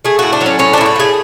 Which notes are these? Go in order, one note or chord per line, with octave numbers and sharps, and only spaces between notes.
A3 G#4
A2 F#4
D4
F#3
C#4
A2 C#4
D4
A2 E4
F#4
A3 G#4